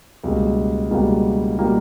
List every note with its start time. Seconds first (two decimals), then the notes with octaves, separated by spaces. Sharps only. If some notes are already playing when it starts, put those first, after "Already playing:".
0.24 C#2 B2 G3 A#3
0.91 C#2 B2 G3 A#3
1.59 B2 G3 A#3